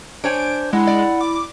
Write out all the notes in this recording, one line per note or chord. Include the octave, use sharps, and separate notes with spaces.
D4 C5 C#5 G#5 D7
G#3 E4 F#5 B5
D5
D6